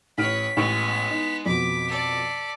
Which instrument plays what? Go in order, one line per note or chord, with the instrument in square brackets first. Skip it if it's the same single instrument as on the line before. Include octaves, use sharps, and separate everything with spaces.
[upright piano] A1 F6 D7 [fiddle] B4 C#5 [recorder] B6
[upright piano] A1 C#6 [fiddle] G#3 B3
[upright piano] D#4
[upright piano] F2 B2 [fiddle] D6 [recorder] B6
[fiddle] A4 D5